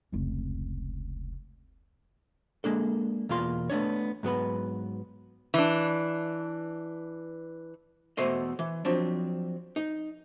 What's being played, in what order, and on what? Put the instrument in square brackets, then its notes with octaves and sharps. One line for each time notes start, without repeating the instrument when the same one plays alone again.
[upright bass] F1 C#2
[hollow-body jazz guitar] G#3 A#3 D4 A4
E2 B2 A#3 F4 F5 C6
A3 B3 D4 C#5
G#2 F#3 B3 B4
[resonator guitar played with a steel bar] E3 D4
[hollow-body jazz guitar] E2 B2 A3 C5 D#5
E3
F3 F#3 C4 D4
D#4